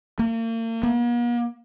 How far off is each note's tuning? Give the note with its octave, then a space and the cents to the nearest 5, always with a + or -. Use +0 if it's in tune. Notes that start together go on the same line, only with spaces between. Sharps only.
A#3 -40
A#3 +45